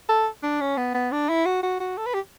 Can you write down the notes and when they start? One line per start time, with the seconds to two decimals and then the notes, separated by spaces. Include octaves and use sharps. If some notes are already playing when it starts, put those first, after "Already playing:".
0.09 A4
0.43 D4
0.61 C#4
0.77 B3
0.94 B3
1.12 D4
1.29 E4
1.45 F#4
1.63 F#4
1.80 F#4
1.97 A4
2.06 B4
2.14 G4